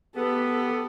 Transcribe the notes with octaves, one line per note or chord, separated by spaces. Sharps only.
B3 G4 A4